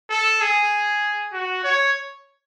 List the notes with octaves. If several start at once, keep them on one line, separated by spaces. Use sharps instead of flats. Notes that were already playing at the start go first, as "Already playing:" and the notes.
A4
G#4
F#4
C#5